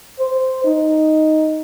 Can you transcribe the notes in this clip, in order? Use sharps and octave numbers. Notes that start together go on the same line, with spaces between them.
C5
D#4